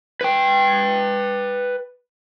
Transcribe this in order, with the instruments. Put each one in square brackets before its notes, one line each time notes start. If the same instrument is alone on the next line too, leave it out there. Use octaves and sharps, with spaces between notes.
[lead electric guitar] B4 G5